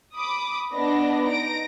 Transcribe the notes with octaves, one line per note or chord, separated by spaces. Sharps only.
B5 D6 D#6
B3 D4 B4 D5 D#5 A#6
D#4 A#6 D7